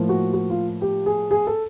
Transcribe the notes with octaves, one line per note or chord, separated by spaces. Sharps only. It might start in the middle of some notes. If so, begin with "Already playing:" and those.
Already playing: A2 F3 A#3
F#4
F#4
F4
G4
G#4
G#4
A4